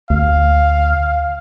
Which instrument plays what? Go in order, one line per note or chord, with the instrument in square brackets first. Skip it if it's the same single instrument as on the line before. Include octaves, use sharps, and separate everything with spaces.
[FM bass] D2 [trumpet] F5